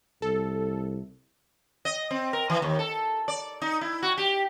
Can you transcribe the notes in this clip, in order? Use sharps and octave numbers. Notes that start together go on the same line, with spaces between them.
C2 A4
D#5
C4
A#4
E3
D#2
A4
D5
D#4
E4
F#4
G4